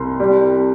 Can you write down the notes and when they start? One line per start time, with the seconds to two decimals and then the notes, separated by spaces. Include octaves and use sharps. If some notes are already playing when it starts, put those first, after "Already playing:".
Already playing: C2 C6
0.20 G3